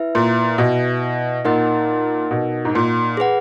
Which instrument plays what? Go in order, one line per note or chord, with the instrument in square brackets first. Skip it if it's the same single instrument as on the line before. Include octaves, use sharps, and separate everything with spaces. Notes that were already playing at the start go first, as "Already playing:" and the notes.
Already playing: [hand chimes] E4 B4 E5
[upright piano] A#2
B2
[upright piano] A#2 [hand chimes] D#4 A#4 D#5 F#5
[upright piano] B2
G#2
A#2
[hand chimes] G#4 B4 F#5